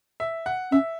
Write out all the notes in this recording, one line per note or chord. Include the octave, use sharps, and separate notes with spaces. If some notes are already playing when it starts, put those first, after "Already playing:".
E5
F#5
C#4 E5